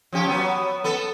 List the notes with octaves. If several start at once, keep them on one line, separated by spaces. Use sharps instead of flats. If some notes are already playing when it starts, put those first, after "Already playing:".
F3 C#4 G4
F#3 B3
B3 A4